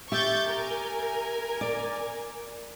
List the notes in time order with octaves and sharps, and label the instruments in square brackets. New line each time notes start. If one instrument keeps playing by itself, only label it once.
[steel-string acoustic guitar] G4 E5 [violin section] C#6 G6 A6
[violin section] A#4 G#5
[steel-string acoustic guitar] D5